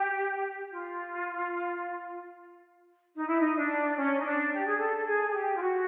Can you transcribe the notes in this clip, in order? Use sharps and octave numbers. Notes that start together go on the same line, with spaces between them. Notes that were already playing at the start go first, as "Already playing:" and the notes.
Already playing: G4
F4
D#4
E4
D#4
D4
C#4
D#4
D4
G4
G#4
A4
G#4
G#4
G4
F4
F#4